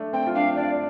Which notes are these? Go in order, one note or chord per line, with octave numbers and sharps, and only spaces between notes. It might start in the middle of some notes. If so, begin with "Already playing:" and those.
Already playing: A3 D4
C4 G5
F4
D4 F5
D4 D5